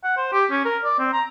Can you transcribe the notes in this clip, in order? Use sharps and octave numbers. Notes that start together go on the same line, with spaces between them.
F#5
C5
G4
C#4
A#4
D5
C4
A#5